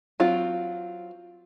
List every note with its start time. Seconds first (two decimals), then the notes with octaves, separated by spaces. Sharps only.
0.20 F#3 C4 F4